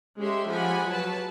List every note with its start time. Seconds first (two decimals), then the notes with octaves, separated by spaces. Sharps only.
0.19 G#3 C#4 G4 A4 E5 C6
0.49 F3 G#3 G4 F#5 G#5 B5
0.87 F#3 B4 A5